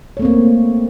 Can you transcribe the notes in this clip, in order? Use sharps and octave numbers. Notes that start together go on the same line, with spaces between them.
A3 A#3 C4 C#5